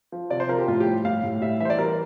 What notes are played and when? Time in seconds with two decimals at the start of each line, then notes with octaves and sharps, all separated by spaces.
0.12 F3
0.30 C3 D5
0.40 C5
0.49 F3 A#4
0.58 G4
0.68 A2 F4
0.80 G4
0.87 G3
1.05 A2 F5
1.23 A2
1.42 G3 E5
1.60 E3 E5
1.65 C5
1.70 D5
1.78 G3 A#4